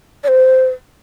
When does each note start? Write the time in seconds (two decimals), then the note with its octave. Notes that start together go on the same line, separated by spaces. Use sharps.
0.24 D5
0.28 C5